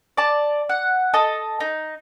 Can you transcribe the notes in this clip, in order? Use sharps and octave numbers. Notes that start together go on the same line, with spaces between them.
D5 A5
F#5
A4 D#5
D#4